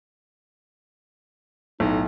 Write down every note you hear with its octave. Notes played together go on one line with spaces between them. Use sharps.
B1 A2 D#4